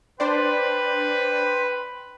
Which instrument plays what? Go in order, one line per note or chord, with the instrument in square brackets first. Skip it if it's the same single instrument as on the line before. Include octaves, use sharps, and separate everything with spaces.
[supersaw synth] D4 C5 D5 [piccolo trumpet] B4 [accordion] G5 B5 C6